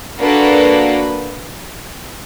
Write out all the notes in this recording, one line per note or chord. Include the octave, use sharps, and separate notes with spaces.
A#3 D4 F#4 A4 B4